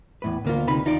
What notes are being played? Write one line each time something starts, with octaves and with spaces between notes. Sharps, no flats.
E2 A2 B4
D2 B2 A#3 B3 F4
D2 C3 D#4 B4 B5
D#2 D#4 F4 D5